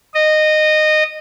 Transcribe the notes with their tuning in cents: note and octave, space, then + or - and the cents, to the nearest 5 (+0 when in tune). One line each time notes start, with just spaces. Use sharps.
D#5 -15